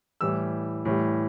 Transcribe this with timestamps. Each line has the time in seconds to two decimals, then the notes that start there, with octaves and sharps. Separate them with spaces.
0.21 A2 E3 G3 E6
0.85 A2 E3 G3